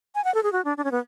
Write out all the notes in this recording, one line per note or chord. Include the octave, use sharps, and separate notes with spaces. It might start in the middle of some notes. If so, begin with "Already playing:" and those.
G#5
F#5
A4
G#4
F#4
D4
D4
C#4
B3